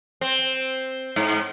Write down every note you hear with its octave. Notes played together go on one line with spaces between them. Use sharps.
C4
G#2